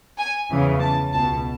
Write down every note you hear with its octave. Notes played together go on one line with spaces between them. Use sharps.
G#5
E2 C#3 E3
A5
C#2 B2 A5